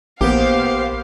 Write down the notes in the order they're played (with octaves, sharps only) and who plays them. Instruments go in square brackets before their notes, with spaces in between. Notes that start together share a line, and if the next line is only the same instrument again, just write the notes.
[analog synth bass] A#1 [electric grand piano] A#3 B3 [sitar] G4 [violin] C5 F5